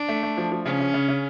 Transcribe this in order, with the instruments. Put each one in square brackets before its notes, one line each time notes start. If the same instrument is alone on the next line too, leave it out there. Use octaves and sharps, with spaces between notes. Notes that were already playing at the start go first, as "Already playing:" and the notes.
Already playing: [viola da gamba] D4
[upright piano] A3
A3
F3
F3
[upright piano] C#3 [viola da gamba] C#4
[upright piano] C#3
C#3
C#3